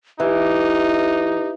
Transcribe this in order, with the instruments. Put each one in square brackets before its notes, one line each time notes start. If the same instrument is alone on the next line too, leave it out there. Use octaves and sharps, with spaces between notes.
[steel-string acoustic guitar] E3 [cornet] D#4 [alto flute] G4